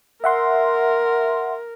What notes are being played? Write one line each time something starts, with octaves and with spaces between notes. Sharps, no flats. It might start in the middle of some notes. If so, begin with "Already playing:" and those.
A#4 E5 F#5 C6